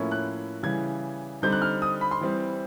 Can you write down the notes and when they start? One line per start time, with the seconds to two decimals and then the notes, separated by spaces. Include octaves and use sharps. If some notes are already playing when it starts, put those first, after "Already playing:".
Already playing: A2 F3 A#3 C#4 E4
0.11 F#6
0.63 C#3 E3 G3 G#6
1.42 D3 G3 C4 D#4 G6
1.52 F#6
1.62 F6
1.82 D#6
2.01 B5
2.11 C6
2.21 E3 G3 C4